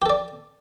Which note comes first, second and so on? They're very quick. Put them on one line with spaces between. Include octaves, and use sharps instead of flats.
G4 A4 D5